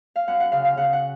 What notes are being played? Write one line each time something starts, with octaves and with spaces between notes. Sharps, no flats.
F5
F#2 F#5
F#5
C#3 F5
F5
C#3 F#5
F#5